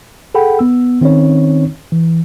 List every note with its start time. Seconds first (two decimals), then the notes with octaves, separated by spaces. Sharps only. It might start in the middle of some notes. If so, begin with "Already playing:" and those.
0.35 G#4 A4 F#5 G5 B5
0.59 B3 E6
1.01 D#3 C4 C#4 D#4 C#5
1.92 E3